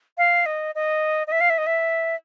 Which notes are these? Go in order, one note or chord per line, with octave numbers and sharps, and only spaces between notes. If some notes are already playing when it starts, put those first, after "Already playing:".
F5
D#5
D#5
D#5
E5
F5
E5
D#5
E5